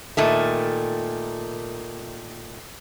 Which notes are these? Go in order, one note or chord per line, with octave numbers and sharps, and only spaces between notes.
A#2 D#3 A3